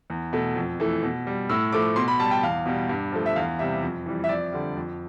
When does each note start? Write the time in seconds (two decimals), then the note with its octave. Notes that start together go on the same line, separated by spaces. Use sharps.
0.10 E2
0.33 B2 A3
0.56 F2
0.80 E3 A3
1.03 B2
1.27 G3
1.49 A2 E6
1.73 F3 A3 D6
1.96 B2 C6
2.08 B5
2.19 G3 A5
2.31 G5
2.43 E2 F5
2.66 B2 G3
2.89 G2
3.12 F3 A3
3.26 E5
3.36 E2 F5
3.59 C3 G3 E5
3.83 F2
4.06 E3 G3
4.24 E5
4.29 F2 D5
4.52 D3 G3
4.76 F2